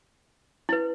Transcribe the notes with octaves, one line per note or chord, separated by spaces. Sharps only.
E4 B4